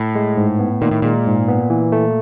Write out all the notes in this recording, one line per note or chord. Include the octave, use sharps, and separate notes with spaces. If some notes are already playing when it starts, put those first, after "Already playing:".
Already playing: A2
G#3
G#2
B3
A#2 D#3
A2
A#2 G#3
G#2
B3
E3
A3